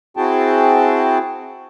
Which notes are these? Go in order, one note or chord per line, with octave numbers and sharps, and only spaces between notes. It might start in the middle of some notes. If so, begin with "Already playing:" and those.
C4 E4 F#4 G#4 G5 A5